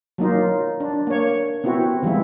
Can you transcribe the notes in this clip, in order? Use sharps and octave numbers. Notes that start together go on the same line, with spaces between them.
F#3 A#3 D#4 F4
D4
A#3 C#5
B3 C4 E4 F#4
E3 F3 G#3 E4